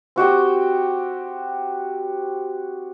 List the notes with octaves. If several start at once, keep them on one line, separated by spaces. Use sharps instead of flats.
C4 F#4 G4 G5